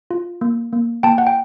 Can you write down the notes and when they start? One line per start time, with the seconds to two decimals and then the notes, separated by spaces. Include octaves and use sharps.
0.11 F4
0.41 A#3
0.73 A#3
1.03 A#3 G5 A5
1.18 F#5
1.27 G5